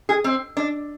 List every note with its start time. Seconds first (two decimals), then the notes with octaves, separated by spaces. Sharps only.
0.09 G#4
0.24 C4
0.57 D4